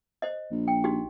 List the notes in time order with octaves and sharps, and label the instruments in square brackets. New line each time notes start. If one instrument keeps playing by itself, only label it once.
[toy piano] C5 D#5
[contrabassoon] A#1
[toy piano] G5
D#4 F#4 G4